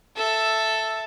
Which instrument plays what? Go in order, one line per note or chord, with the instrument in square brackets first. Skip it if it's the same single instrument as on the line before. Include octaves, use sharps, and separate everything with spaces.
[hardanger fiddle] A4 E5